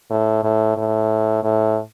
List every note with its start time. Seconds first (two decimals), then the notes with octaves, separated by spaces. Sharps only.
0.10 A2
0.43 A2
0.77 A2
1.44 A2